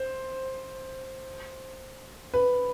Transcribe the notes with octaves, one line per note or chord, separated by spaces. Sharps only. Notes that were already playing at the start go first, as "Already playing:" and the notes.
Already playing: C5
B4